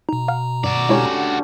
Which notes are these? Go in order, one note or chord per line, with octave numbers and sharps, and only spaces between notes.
B2 D#4 A#5
F5 F#5 F6
G2 F#4 D5
D3 G#3 C#4 E4 G4 C#5